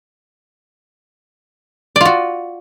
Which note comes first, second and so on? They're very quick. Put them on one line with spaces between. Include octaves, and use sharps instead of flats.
D5 F4 F#4